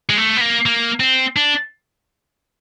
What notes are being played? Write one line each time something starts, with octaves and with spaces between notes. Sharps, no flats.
G#3
A3
B3
A#3
A#3
C4
D4